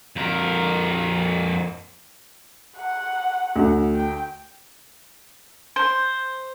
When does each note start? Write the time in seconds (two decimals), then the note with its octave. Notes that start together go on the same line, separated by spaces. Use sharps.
0.16 F2 A#4
2.77 F#5
3.56 D2
3.95 G5
5.76 C5